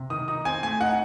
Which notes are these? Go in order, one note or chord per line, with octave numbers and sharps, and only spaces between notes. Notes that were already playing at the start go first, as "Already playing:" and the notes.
Already playing: C3
D#3 D#6
D#4 D#6
C4 G#5
A3 G#5
D#4 F#5